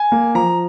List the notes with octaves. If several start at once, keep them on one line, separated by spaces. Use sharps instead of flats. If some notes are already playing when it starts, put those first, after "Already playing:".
Already playing: G#5
A#3
F3 A#5